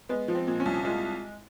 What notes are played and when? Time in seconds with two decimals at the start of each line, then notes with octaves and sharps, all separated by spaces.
0.09 G#3 B3
0.28 F3
0.35 C4
0.47 A#2
0.60 C#4
0.66 C2
0.85 G#3 F4